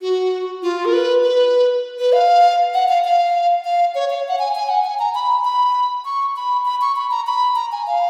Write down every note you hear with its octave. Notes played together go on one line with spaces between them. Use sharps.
F#4
F4
A#4
B4
B4
B4
F5
F#5
F5
F5
F5
C#5
F5
F#5
G#5
G#5
F#5
G#5
A#5
B5
B5
C#6
B5
B5
C#6
B5
A#5
B5
A#5
G#5
F5